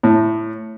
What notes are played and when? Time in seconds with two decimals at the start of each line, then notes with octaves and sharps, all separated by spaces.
0.03 A2